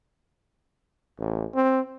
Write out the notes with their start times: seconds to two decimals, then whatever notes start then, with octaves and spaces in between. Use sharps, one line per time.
1.19 A1
1.54 C4